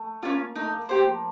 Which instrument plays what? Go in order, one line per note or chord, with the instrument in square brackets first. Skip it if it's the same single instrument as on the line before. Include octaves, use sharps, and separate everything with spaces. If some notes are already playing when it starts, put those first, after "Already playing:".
Already playing: [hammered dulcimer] A3
[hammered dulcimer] A#3 [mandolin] C#4 F4
[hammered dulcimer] A3 [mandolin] D#4
[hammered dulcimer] A#3
[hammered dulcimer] A#3 [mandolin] G4 C5
[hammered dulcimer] F3